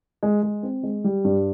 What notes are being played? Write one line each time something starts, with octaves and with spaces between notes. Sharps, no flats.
G#3
G#3
C4
G#3
G3
G2